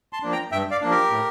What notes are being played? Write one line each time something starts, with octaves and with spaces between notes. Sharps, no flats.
A5 C6
F3 A#3 D4
G5 A#5
G2 E5 G5
D5 F5
F3 A#3 D4
G4 A#4
A2